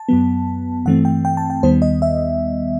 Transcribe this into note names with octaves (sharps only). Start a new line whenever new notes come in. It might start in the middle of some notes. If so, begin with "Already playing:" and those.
Already playing: A5
F#2 F#3 B3
G2 E3 A3 C4 F#5
G5
G5
A5
G5
D#2 D#3 G3 B3 C5
D#5
E5